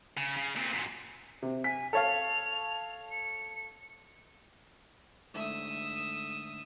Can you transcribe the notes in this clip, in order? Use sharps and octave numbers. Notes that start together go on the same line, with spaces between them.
C#3
C#3
A#2 C4
F#2 A#2
C3
G#5 B6
A4 C#5 F5 F7
C#7
G#2 D3 A3 E5 D#6